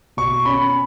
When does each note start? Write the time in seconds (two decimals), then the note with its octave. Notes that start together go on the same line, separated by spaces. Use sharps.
0.17 B2 C#6
0.45 C#4 B5